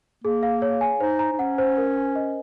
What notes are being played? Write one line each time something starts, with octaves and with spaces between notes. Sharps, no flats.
A#3 G#4
F5
C#5
G#5
D#4 C5
A#5
D#4
C#4 F#5
C5
A#4
G#5
D#5